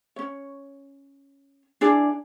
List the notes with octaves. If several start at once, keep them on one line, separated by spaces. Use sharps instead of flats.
C#4 C#5
D4 E4 G#4 D5